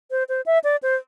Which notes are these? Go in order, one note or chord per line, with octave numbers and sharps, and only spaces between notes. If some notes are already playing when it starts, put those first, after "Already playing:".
C5
C5
E5
D5
C5